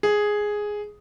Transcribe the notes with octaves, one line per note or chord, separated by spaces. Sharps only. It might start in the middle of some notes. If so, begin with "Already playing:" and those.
G#4